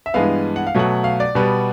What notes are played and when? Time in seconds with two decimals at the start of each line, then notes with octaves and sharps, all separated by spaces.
0.06 E5
0.14 G2 E3 G#3 B3 F5
0.56 F#5
0.67 F5
0.75 B2 F#3 A3 F#5
1.04 F5
1.20 D5
1.35 B2 G3 B3